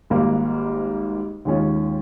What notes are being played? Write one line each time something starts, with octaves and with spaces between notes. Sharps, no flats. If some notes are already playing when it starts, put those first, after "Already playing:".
G#1 G#2 G3 A#3
D#2 D#3 G#3 C#4 F4